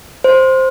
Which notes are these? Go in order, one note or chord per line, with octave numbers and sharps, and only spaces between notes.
C5